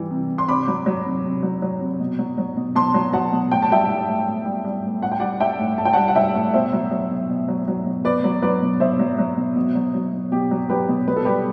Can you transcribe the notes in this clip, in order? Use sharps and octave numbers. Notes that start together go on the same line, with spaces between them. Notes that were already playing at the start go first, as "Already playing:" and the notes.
Already playing: E3 G3
C3
C3
C6
C3 B5 D6
F#3
F#3
C3
C3
F#3
F#3
C3
B2
F#3
F#3
B2
B2 A5 C6
F#3
F#3 F#5 A5
B2
A2 G5
A5
G3 E5 G5
G3
A2
A2
G3
G3
A2
A2 F#5
G5
G3 D5 F#5
G3 E5 G5
A2
A2 A5
G5
G3 F#5 A5
F#5
G3 E5 G5
A2
B2 C5 E5
F#3
F#3
B2
B2
F#3
F#3
B2
B2 B4 D5
F#3
F#3 B4 D5
B2
B2 C5 E5
F#3
F#3
B2
B2
F#3
F#3
B2
B2 G4
F#3
F#3 G4 B4
B2
B2 B4
A4
G3 G4 B4